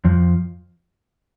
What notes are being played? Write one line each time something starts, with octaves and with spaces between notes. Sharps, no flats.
F2 F3